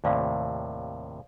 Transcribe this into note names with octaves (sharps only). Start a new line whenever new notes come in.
D#2 A2 C3 C5 D5 F5